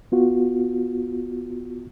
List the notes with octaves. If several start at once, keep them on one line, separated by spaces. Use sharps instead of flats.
B3 F4 F#4